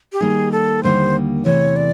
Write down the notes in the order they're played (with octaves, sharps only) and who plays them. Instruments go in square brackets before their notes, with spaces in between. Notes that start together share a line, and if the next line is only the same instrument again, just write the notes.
[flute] G4
[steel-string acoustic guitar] D#3 G3 A#3 D#4 [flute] G#4
[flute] A4
[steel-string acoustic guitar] D#2 D3 G3 A#3 D#4 [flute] C5
[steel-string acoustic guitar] E2 C3 E3 A3 [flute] C#5
[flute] D5